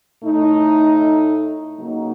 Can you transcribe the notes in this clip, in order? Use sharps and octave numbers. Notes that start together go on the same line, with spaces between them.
A2 A3 D#4
C#3 F#3 A#3 D#4